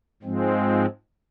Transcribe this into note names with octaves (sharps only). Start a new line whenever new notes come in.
G#2 F3 G#3 C4